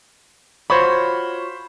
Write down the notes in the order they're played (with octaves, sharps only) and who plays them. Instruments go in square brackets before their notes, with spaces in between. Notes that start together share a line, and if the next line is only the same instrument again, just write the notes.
[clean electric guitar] F4 F#4 C#5 [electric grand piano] C5 B5